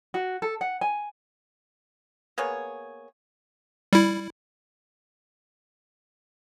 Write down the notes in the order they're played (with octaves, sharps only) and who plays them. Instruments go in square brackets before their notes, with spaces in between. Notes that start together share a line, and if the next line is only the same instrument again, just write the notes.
[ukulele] F#4
A4
F#5
G#5
[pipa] A#3 B3 G#4 C#5
[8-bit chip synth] G3 E4